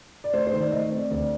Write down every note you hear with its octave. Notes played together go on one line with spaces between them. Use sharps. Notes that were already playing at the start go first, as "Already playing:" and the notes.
D5
A3 C5
C5
D#3
D5
A3 D#5
C4
D5
D2 D5